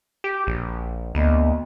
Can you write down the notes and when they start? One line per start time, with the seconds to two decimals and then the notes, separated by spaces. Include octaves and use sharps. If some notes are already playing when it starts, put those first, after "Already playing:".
0.24 G4
0.47 A#1
1.15 D2 A#3 B3 D#5